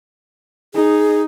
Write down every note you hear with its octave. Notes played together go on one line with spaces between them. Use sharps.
D#4 G#4